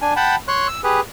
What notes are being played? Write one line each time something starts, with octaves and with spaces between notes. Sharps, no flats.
D4 G#5
F#5 G5 A5 B5
C#5 C6 F#6
E6
G4 G#4 B4